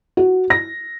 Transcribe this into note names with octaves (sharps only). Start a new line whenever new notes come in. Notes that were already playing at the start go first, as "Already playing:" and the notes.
F#4
A#6